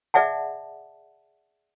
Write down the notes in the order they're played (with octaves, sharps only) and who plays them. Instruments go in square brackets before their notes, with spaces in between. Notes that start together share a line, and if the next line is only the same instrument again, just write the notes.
[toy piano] G#4 D5 E5 F#5 A5